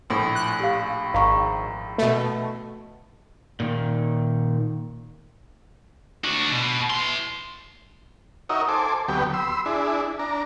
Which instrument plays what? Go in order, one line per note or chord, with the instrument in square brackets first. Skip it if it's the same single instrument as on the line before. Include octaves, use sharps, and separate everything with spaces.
[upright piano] A#1 A2
[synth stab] F#6
[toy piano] G4 F5
[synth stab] G#1 [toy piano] F5 A#5 C#6
[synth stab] B2 A3
[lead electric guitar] A#2 D#3
[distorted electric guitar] D3 F#4
B2
E3 C6
[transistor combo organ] D#4 F#4 A#4 C#5 D#5 E5
A4 C5 G#5 D6
D2 F#3 B3 G4 G5
B5 C6 E6
D4 E4 G#4
D4 A#5